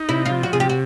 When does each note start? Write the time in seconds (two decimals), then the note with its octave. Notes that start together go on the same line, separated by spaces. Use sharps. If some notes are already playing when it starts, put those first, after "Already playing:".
Already playing: D#4
0.09 C3 E4
0.25 F4
0.31 F3
0.43 F#4
0.53 C3 G#4
0.60 G4
0.69 F#4